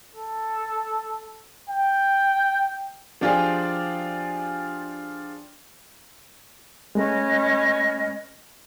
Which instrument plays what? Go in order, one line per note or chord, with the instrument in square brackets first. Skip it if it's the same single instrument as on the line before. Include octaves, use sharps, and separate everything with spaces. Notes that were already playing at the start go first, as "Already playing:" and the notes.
[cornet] A4
G5
[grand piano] F3 D4 F4 G4 G#4 D5
[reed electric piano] G#3 A3 [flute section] C#4 B4 D#5